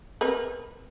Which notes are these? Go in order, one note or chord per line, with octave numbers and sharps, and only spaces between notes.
C4 A#4 B4